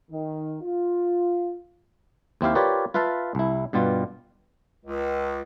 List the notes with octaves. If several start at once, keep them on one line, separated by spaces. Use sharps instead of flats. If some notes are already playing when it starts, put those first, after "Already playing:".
D#3
F4
D#2 C4 E4 G4 F5
F4 G4 A#4 B4 C#5 D5
F4 B4 E5 F5 A5
C2 E4
G2 B2 G3 F4
C#2